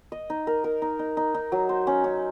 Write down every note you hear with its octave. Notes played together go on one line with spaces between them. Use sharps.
D#5
D#4
A#4
A#4
D#4
D#4
D#4
D#4
F#3
C5
C#4
C#4